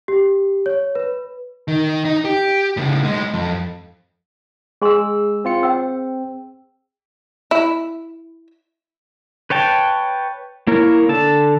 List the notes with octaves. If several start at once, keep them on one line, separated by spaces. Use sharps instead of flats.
G4
C#5
B4
D#3
D#4
G4
A2 C#3
B1 G#3
F2
G#3 G#4 G#5 C6 E6
C4 F4 C#7
C4 G5 E6
E4
B4 C#5 G5 A5
A#3 E4 A#4 C#5
D3 A4 A5